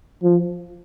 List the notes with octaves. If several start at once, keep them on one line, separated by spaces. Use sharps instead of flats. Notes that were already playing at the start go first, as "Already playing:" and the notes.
F3